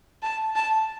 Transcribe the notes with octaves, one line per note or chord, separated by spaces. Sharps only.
A5
A5